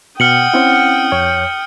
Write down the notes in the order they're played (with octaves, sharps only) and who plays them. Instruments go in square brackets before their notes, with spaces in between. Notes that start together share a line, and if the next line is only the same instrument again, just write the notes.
[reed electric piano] B2 [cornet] F#5 [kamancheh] G5 D#6 [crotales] F6 C#7 F#7
[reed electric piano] C4 C#4 E4
F2 C#5 G6